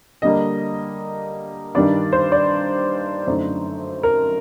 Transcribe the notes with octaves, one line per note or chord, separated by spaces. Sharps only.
D3 G3 A#3 D#5
G2 D#3 G3 D4 D5
C5
D5
F#2 D3 A3 D#4 C5
A#4